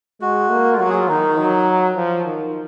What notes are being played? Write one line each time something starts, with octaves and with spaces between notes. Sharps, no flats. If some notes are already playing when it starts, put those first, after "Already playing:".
G#3 F#4
A#3
F4
F#3 F#4
G#4
F4
D#3 D#4
F#3
F3
D#3